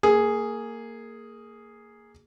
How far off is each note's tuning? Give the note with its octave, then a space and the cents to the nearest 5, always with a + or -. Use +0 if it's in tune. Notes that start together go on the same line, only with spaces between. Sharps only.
A#3 -20 G#4 +0